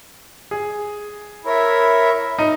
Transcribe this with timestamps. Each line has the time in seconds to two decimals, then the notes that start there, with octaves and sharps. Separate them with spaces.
0.51 G#4
1.45 E4 A#4 C#5 E5
2.39 D#4